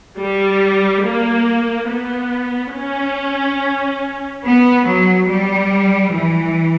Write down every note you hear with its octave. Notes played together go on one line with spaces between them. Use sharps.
G3
A#3
B3
C#4
B3
F#3
G3
E3